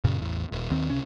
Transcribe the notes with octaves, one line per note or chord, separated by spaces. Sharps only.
F#2 A#2 C#3
A1 E2
D#1
D#2 D#3 C4
C#2 C3 C#4